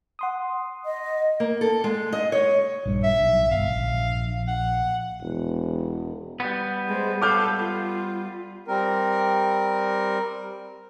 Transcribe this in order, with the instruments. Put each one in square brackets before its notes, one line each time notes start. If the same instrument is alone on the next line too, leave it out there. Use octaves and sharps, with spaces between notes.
[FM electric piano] F#5 C6 D#6
[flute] D#5
[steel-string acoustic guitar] A#3
A4
G#3
D#5
C#5
[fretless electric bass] A#1 G2
[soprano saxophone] E5
[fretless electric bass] B1
[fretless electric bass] G1 [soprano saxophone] F5
[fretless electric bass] A#1
[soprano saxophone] F#5
[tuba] E1
[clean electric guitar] G3 B3
[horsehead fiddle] G#3 C5
[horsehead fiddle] A4 F5 [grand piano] D6 F6 G6
[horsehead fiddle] F4
[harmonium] G3 C4 A#4